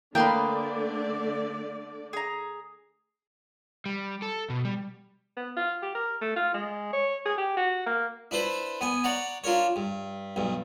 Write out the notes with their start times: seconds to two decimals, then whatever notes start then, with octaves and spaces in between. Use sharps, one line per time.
0.15 D3 A3 A#3 B4 D5 D#5 G5 C6
2.13 G#4 A#5
3.86 G3
4.22 A4
4.50 B2
4.65 G3
5.37 B3
5.56 F4
5.82 G4
5.95 A#4
6.21 A3
6.36 F4
6.54 G#3
6.93 C#5
7.26 G#4
7.38 G4
7.57 F#4
7.86 A#3
8.31 D4 E4 B4 C5
8.81 B3 G#5
9.04 C#5 D5 F#5 A#5
9.44 D4 F4 A#4 C#5
9.76 G2
10.36 B1 G2